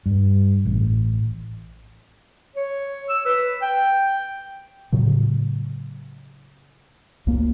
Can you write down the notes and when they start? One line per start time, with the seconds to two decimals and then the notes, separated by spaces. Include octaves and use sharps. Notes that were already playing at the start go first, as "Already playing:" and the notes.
0.06 G2
0.65 A1
2.56 C#5
3.10 E6
3.25 B4
3.62 G5
4.92 A2 C#3 F#3
7.27 C#2 A#3